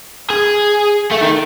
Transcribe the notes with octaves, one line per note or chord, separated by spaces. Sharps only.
G#4
A3
D#3